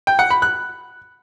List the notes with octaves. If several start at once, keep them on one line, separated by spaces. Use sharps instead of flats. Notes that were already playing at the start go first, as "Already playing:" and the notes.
G5
F#5
B5
F#6